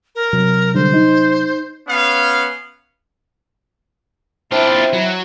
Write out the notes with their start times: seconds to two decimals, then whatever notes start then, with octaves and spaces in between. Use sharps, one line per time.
0.15 A#4
0.33 C3 F#3
0.75 D3 G3 C5
0.94 D#4
1.87 B3 C#4 F5
4.51 C4 D4 E4 F4
4.93 F#3